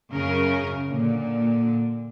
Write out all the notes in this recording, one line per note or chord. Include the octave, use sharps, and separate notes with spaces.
F#2 C#3 C#4 A#4
A#2 D3